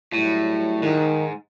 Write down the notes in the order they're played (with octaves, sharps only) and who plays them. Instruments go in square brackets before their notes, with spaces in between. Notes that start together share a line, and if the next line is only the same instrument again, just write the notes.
[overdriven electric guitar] A2 [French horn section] F#3 G3 E4
[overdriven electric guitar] G#2 [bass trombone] D#3